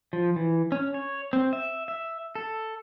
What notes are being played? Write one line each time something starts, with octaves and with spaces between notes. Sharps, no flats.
F3
E3
C#4
C#5
C4
E5
E5
A4